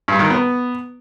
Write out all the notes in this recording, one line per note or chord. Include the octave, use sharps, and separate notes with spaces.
G2
D#3
B3